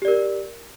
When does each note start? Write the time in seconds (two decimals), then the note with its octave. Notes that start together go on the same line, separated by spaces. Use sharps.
0.02 G4
0.05 D5
0.08 A#4